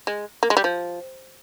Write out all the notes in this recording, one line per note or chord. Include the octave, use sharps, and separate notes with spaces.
G#3
A#3
G#3
G3
F3